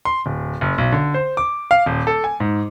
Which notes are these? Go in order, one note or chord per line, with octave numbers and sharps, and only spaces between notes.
C6
D1
F#1
B1
D3
C5
D6
F5
D#1
A4
G#5
G#2